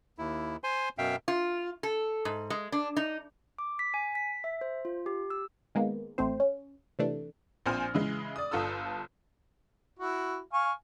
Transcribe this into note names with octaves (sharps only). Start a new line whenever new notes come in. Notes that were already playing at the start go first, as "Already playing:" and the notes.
D#2 E4
C5 G#5 C6
F#2 B2 E5 F5 G5
F4
A4
G#2
G#3
D4
D#4
D6
B6
G#5
B6
E5
C5
F4
G4
E6
D#3 G#3 A#3 B3
A1 A3 C4 C5
C#4
C3 E3 A3 D4
A#1 F3 C4 C5 G#5 F6
C#3 E3 G#3
D5 D#6
G1 F4 A4 D#6 E6
E4 F#4
F5 G#5 C#6